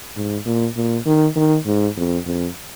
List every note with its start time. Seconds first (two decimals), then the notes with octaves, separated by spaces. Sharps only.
0.16 G#2
0.46 A#2
0.76 A#2
1.06 D#3
1.36 D#3
1.66 G#2
1.97 F2
2.26 F2